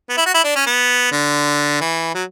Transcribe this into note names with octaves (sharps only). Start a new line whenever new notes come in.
B3
E4
F#4
E4
D4
C#4
B3
D3
E3
F#3